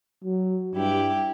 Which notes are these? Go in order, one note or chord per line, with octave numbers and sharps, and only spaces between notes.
F#3
G2 E4 G4